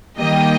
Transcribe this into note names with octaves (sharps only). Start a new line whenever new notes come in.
D#3 G3 A#3 D#5 G5